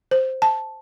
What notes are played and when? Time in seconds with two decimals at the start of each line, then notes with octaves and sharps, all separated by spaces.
0.11 C5
0.42 A5